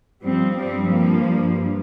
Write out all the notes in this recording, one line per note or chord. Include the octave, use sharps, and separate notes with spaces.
G2 F3 G3 C4
G3 C4
F3 A#3